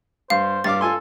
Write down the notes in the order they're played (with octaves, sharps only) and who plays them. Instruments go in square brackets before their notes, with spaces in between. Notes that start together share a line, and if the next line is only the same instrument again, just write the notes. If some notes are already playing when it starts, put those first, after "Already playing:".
[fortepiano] G2 [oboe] C5 [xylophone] F5
[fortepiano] G2 F5 D6 [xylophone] A6
[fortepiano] F4 G#5 C6 [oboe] A4